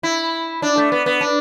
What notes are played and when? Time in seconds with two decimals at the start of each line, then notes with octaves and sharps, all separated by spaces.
0.03 E4
0.62 D4
0.77 A3
0.92 B3
1.06 B3
1.21 D4